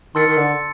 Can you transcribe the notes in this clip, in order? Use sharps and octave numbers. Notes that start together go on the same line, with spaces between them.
D#3 A5 C6 E6 A6 C#7
D#3
D3